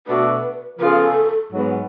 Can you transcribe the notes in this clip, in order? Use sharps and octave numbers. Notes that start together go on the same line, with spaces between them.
B2 A3 D4 F#4 B4
C#3 F3 B3 F4 G#4 A4 B4
G#2 F#3 B3